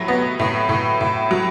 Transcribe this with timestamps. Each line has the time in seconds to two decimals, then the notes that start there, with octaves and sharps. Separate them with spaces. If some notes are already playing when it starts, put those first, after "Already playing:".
Already playing: A2 F#3
0.08 B3
0.39 A2
0.69 A2
1.01 A2
1.31 F#3